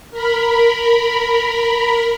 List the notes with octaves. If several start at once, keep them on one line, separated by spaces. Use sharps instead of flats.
A#4 B5